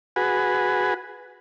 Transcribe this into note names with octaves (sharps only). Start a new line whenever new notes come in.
F#4 G#4 B4